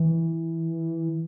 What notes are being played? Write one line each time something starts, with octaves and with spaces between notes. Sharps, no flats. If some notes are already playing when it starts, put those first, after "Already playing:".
Already playing: E3